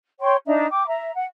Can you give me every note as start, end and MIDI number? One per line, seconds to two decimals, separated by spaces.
0.21 0.36 73
0.21 0.36 79
0.21 0.36 84
0.21 0.36 85
0.46 0.66 62
0.46 0.66 63
0.46 0.66 76
0.46 0.66 82
0.70 0.86 79
0.70 0.86 86
0.87 1.11 76
0.87 1.11 82
1.16 1.25 78